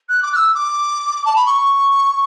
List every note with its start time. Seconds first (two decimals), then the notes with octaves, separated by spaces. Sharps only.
0.09 F#6
0.23 D6
0.33 F#6
0.36 E6
0.54 D6
1.25 A5
1.36 B5
1.46 C#6